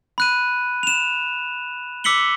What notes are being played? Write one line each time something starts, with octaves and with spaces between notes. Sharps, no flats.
B5 F#6 D#7
E7 F7
D6 E6 B6 C#7 F#7 G7